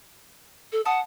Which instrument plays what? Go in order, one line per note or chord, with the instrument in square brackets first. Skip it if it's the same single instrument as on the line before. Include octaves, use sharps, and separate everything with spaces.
[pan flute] A4
[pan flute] F#5 [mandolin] A5 D#6